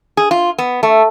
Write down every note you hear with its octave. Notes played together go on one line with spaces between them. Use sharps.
G#4
F4
B3
A3